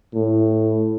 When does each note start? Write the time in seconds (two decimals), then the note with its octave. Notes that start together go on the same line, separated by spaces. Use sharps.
0.14 A2